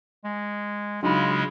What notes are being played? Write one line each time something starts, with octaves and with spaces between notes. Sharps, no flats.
G#3
C#3 F#3 G#3 D4 D#4 F4 B5